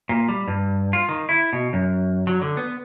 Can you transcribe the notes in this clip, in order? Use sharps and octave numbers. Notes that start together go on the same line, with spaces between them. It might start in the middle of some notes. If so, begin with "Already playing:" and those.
A#2
G3
G2
F4
D#3
E4
B2
F#2
F#3
D3
B3